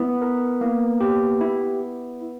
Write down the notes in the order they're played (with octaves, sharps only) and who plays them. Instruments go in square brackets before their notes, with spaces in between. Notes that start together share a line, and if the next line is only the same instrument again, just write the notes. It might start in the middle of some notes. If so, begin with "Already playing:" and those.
Already playing: [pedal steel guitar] B3 [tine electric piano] E4
[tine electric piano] A#4
A#3
G4
E4